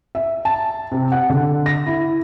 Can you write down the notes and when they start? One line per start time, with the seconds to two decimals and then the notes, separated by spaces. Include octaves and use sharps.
0.15 E5
0.45 A5
0.92 C3
1.12 F#5
1.30 D3
1.66 A#6
1.86 E4